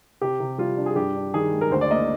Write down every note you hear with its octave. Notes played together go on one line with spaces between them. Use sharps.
C3 G4
C3
G3 F4
D4
G#4
G2 G4
D4
D#3 G#4
G#3
A#4
D2 C5
D5
A#3 D#5